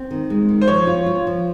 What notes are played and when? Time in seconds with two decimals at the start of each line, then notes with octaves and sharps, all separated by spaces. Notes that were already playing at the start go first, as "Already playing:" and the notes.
Already playing: C4
0.11 D#3
0.30 G#3
0.49 D#3
0.61 C5
0.68 F3 C#5
0.87 F4
1.06 F4
1.27 F3